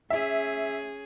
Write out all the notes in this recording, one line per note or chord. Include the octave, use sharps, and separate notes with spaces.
C#4 G#4 E5